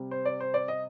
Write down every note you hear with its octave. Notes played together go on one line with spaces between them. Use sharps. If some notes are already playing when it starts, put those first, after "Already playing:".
Already playing: C3 G3
C5
D5
C5
D5
D#5